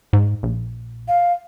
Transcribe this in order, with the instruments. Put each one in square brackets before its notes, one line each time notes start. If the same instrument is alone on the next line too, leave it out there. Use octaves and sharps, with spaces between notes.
[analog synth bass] G#2
A#1
[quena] F5